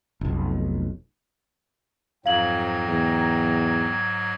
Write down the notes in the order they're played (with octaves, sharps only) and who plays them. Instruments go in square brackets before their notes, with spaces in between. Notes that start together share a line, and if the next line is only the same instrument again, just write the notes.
[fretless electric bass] F1 B1
[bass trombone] F2 [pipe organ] G#2 F#3 G#6 [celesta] F5 F#7 [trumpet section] G5 A#5
[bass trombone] E2